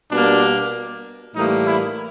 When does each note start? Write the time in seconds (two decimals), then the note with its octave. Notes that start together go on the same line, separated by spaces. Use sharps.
0.11 B2 G3 A#3 D4
1.35 A2 E3 G3 A#3 D#4
1.67 E4